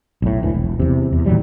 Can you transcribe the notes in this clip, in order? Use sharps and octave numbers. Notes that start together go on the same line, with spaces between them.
B1 A2
E1 D2 E3
E1
E2 C3
E2
A2 D#3 F#3 G3